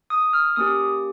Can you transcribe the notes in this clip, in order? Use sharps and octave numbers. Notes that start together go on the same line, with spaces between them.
D#6
F6
A#3 C#4 G4 D#6